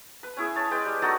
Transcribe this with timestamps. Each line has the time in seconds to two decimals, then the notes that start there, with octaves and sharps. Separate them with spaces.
0.23 B4
0.37 C#4 E4 G#4
0.55 C#5 A5
0.71 G#3 B4 G5
0.86 G3
1.02 A3 D#4 F#4 A4